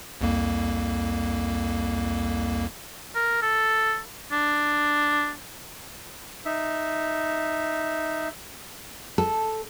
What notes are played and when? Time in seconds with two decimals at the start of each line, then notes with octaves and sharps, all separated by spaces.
0.21 C2 F2 A#3
3.15 A#4
3.42 A4
4.32 D4
6.46 D#4 E5
9.18 A4